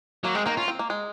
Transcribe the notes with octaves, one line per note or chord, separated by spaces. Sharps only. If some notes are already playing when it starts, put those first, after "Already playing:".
F#3 A#3
G#3 C4
D#3 A#3 D#4
C#4 F4
C4
A#3
G#3